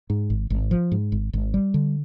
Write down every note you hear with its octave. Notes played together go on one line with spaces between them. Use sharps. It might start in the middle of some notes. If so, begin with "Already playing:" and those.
G#2
G#1
G#1
F3
G#2
G#1
G#1
G3
D3